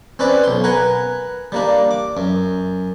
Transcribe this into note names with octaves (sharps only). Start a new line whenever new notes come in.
C4 C#4 B4 D5
B1 C6
A#4 B4 F#5 G#5
G3 A#3 D4
D6
F#2